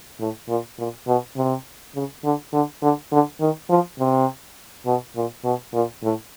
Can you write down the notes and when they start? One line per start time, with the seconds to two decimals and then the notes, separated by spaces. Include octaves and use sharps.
0.20 A2
0.49 A#2
0.78 A#2
1.07 B2
1.36 C3
1.95 C#3
2.24 D3
2.53 D3
2.82 D3
3.11 D3
3.40 D#3
3.69 F3
3.99 C3
4.86 B2
5.16 A#2
5.44 B2
5.74 A#2
6.03 A2